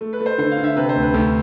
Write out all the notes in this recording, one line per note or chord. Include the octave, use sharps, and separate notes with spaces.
A3
B4
A3
C5
D3 C5
F5
D3
E5
C3 B4
C5
D2
B4
D2 A4